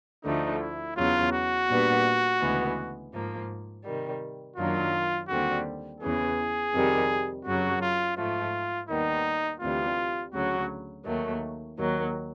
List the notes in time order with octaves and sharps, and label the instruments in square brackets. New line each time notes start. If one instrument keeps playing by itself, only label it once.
[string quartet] D2 D3 F3 A3 [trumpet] D#4
[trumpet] E4
[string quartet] E2 C#3 F#3 [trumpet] F4
[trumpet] F#4
[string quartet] A#2 G3 B3 D4
D2 C#3 E3 G#3 B3
G#2 F3 A#3
C3 D#3 G3
[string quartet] F#2 D#3 F#3 A#3 D4 [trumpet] F4
[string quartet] D#2 D3 G3 C4 [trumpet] F#4
[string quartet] E2 C#3 E3 [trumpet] G#4
[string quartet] F2 C3 D#3 G3
[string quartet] F#2 C#3 F#3 [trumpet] F#4
[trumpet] F4
[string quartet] G#2 F3 A3 [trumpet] F4
[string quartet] D#2 D#3 G3 B3 [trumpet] D#4
[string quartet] D2 C3 E3 G3 [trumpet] F4
[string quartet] D2 C#3 F#3 [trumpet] F#4
[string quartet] D#2 D#3 F#3 A3
D#2 D#3 F#3